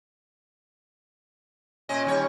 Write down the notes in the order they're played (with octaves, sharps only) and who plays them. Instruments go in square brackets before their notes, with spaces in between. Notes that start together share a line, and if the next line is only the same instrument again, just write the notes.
[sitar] A#2 D#5 [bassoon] C#4
[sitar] D#2 G3 C#5